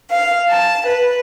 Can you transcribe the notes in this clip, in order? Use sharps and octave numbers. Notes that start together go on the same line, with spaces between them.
F5
A5
B4